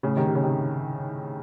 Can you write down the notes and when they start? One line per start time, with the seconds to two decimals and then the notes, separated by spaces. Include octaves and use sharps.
0.03 A2 C#3
0.16 C3 D#3
0.27 C3
0.35 C#3
0.42 C3 D#3